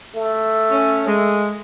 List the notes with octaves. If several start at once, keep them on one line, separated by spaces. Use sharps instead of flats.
A3
C#4
G#3